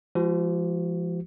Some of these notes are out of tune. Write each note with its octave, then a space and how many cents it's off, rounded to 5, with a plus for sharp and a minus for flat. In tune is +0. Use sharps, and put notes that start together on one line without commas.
F3 -25 G#3 +0 F#4 +35